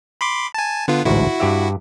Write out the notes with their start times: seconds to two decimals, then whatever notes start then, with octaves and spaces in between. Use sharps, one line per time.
0.21 B5 C6 D6
0.54 G#5 A5
0.88 D3 B3 F4
1.05 A1 D2 G#2 E4 F#4
1.40 G2 G4 E5